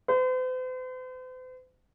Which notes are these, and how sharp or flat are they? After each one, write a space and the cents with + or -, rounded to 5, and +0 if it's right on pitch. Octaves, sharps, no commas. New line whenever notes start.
C5 -45